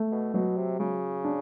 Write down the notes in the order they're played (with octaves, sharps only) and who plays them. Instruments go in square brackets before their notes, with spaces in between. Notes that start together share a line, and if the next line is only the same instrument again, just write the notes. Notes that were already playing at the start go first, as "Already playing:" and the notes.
Already playing: [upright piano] A3
[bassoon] B2
[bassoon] B2 [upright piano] F#3
[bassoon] C3
[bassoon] C#3 [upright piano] F#3
[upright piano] D4